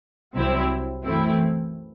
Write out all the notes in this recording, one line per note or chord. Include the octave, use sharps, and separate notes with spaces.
C2 C3 F#3 C4 E4
F#2 E3 A3 C4 E4